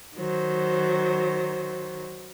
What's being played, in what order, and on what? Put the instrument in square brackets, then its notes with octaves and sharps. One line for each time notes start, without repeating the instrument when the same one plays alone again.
[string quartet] D#3 F#3 C5